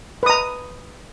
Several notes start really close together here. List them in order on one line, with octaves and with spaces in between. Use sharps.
B4 D#6 A#5